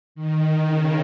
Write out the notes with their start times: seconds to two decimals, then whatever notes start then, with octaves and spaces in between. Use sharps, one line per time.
0.15 D#3
0.67 C#3